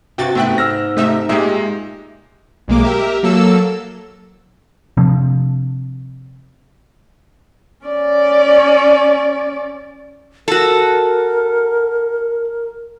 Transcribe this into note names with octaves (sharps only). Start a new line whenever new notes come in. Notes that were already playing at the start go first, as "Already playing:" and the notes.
G2 C3 F#4 G5 A6
G#2 A3 B3 C4 E5 G5 F#6
E6 F6 A#6
C3 A3 D#4 E5
A#2 G#3 D#4 G4 E5
B1 G#3 A#3 D6
G4 A#4 E5
F#3 A#3 A4 E6
C3 F3 C4 D4
C#4 D5
F#4 A4 A#4